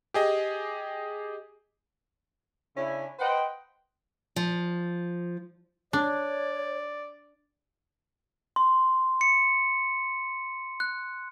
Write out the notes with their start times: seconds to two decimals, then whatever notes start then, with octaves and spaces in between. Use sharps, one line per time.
0.14 G4 G#4 D#5
2.77 C#3 C#4 D4 E4
3.19 B4 C5 D#5 F#5 G5
4.36 F3
5.93 D4 C#5 D5
8.56 C6
9.21 C#7
10.80 F#6